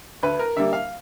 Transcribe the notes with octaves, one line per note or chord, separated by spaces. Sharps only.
D2 B4
A#4
D3 G3 A#3 E5
F5